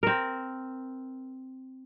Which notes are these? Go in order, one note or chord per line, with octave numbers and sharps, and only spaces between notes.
C4 A#4